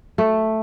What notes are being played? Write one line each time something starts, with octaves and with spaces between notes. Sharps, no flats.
A3